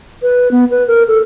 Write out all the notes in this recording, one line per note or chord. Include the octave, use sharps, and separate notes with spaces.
B4
B3
B4
A#4
A4